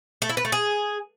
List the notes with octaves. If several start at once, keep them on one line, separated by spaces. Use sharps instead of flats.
A3
E4
B4
A3
G#4